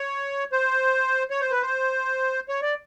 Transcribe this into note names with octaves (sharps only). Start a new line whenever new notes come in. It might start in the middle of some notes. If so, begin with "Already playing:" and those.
Already playing: C#5
C5
C#5
C5
B4
C5
C#5
D5